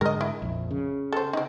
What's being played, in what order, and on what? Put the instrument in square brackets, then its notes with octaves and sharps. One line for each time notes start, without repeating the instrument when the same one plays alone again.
[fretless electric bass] G#2 D3 G#3 [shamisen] A#4 D#5
[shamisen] E4
[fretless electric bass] A#1 F2
C#3
[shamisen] A4 C5
C4 D#4